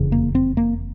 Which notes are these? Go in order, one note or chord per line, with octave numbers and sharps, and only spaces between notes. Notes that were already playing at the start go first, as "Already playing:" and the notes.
Already playing: F1 E2 C#3
A#3
C4
A#3